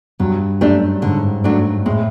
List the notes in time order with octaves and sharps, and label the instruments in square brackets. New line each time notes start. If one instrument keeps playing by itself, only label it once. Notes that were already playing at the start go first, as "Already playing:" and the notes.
[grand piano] G2 [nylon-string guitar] F#3
[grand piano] F#2 [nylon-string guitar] A3 D4 G4
[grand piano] G#2 [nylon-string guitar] D3
[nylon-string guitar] F#3 A3 D4
[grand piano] A2 [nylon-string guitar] G#3